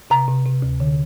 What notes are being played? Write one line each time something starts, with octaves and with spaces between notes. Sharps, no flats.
C3 A#5
C3
C3
D2
D3